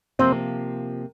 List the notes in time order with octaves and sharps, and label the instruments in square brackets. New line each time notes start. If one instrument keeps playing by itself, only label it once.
[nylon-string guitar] C3 F3 A#3 [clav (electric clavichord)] C4